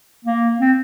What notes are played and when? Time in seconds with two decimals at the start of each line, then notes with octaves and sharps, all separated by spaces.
0.25 A#3
0.60 C4